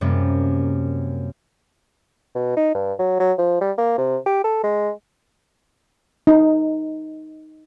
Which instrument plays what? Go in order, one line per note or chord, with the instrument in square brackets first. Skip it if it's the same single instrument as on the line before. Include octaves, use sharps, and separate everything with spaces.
[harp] F#2 C3 G3 A#3
[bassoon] B2
D#4
G2
F#3
F#3
F3
G3
A#3
C3
G4
A4
G#3
[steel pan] D#4